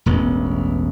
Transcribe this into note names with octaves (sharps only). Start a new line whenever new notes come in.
E1 A1 B3